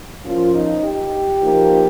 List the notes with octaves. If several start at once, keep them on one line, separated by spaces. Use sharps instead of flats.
F3 A#3 C#4 F4
D#4
G4
F3 A#3 D#4